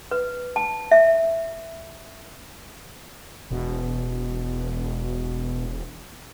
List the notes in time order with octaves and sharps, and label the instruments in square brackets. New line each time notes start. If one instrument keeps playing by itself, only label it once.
[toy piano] B4
A5
E5
[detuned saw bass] E1 [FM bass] B2